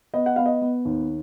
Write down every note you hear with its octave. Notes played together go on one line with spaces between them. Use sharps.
B3 D#5
F#5
B3 F5
D#5
B3
D#2